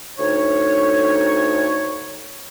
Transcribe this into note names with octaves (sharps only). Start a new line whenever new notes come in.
D2 D#4 C#5